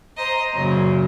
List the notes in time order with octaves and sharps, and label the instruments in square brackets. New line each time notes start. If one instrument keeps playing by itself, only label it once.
[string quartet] C5 D#5 [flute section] A#5 C6
[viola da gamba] F#2 C#3 [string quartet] A#2 [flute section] C#5